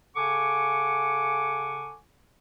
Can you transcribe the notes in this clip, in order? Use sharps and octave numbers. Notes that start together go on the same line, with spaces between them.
C#3 A4 F#5 G#5 C#6 D6